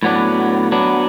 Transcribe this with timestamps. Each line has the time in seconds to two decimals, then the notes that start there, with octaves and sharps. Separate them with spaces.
0.03 A2 F#3 B3 D4
0.72 F#3 B3 D4